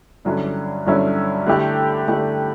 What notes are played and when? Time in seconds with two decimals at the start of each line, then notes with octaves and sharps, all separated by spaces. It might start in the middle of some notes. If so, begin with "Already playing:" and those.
0.25 G2 D3 F#3 C#4 E4
0.86 G2 D3 F#3 C#4 E4
1.46 D3 A3 E4 G4
2.08 D3 A3 E4 G4